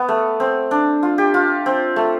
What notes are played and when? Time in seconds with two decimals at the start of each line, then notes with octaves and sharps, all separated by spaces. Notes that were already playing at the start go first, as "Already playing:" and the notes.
Already playing: B3
0.09 A3
0.40 C4
0.71 D4
1.03 F4
1.18 G4
1.34 F4
1.66 C4
1.96 A3